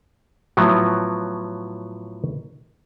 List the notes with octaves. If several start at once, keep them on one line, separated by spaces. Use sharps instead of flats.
A2 F3 F#3 B3